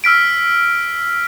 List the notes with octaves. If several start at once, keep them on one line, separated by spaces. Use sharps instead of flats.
E6 F6 B6 D7